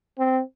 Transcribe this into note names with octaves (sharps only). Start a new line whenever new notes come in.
C4